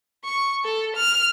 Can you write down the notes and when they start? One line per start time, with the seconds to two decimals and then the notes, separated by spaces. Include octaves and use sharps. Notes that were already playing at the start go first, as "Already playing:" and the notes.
0.24 C#6
0.64 A4
0.96 F6